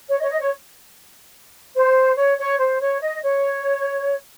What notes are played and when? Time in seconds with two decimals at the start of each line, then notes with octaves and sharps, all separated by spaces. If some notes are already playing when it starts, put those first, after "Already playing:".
0.08 C#5
0.19 D#5
0.24 C#5
0.30 D#5
0.39 C#5
1.75 C5
2.17 C#5
2.38 C#5
2.59 C5
2.80 C#5
3.00 D#5
3.21 C#5